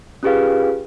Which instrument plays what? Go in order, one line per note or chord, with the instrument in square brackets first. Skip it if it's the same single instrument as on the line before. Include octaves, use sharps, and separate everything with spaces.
[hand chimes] C#4 F4 G4 G#4 B4 F5